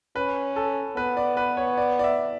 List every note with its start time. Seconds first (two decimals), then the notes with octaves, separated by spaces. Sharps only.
0.16 C#4 B4
0.56 A4
0.97 B3 B4
1.17 D5
1.37 B4
1.57 C#5
1.77 D5
1.99 D5
2.04 E5